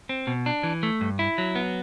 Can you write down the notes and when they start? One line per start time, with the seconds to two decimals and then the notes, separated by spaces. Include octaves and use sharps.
0.09 C4
0.27 B2
0.46 D4
0.63 E3
0.83 A3
1.01 G2
1.19 E4
1.38 F#3
1.55 B3